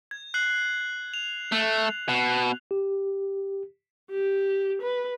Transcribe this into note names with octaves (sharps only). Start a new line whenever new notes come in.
G#6
F#6 C7 F#7
F7
A3
B2
G4
G4
B4